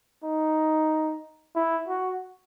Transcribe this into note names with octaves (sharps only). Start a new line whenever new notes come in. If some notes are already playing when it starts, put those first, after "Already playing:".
D#4
E4
F#4